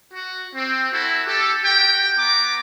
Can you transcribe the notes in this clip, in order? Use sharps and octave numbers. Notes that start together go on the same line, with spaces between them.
F#4
C4
E4 F#4 A4
G4 A4
F#4 G4 G5
B3 A#5 D6